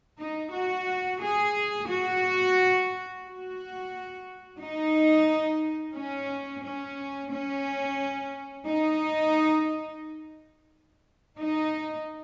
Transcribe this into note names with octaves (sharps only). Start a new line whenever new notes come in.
D#4
F#4
G#4
F#4
F#4
D#4
C#4
C#4
C#4
D#4
D#4